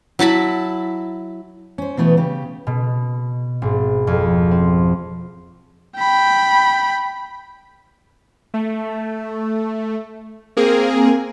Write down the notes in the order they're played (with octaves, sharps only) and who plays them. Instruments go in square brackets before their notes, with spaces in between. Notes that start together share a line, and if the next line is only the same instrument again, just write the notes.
[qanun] F#3 E4 A5 B5
[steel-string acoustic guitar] C#4 C5
B2 E3 A3 B3
C#3 G4
[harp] B2
G#1
F2
C4
[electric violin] G5 B5
[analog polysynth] A3
A#3 C4 G#4 A#4